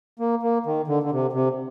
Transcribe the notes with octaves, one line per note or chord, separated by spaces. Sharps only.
A#3
A#3
D#3
D3
D3
C3
C3